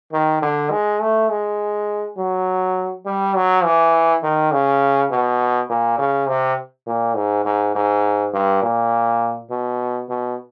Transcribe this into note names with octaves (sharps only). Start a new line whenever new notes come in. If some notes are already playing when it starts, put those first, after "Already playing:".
D#3
D3
G#3
A3
G#3
F#3
G3
F#3
E3
D#3
C#3
B2
A#2
C#3
C3
A#2
G#2
G#2
G#2
G2
A#2
B2
B2